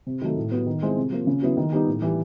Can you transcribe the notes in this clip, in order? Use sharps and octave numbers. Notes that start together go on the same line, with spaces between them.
C3
D#3 F#3 A3
A2
F#3 B3
D#3
G#3 C4 E4
C3
F3 A#3
C#3
F#3 B3 E4
D#3
G3 B3 D#4
A2
E3 G3